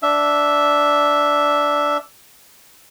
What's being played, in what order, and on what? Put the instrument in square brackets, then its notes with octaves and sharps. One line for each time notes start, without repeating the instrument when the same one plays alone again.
[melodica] D4 E5